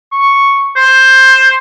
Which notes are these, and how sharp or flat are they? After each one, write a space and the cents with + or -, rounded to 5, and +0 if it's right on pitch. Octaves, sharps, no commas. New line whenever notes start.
C#6 +0
C5 +10